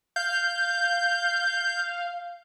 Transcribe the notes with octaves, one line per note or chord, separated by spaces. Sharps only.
F5 G6